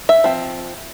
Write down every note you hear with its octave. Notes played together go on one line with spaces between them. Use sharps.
E5
F3 C4